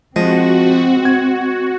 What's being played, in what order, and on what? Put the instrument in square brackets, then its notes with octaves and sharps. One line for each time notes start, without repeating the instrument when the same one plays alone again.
[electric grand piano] F3 [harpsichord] G#3 [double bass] C4 [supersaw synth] F#4
[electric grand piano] G#6